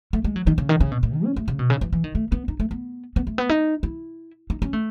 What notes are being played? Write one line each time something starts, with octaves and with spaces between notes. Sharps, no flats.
A3
G#3
F#3
D#3
C#3
D#3
C#3
B2
A2
D#3
C#4
A3
C#3
B2
C#3
E3
E3
D#3
A3
B3
D#4
A3
B3
B3
A3
B3
D#4
E4
D#4
C#4
A3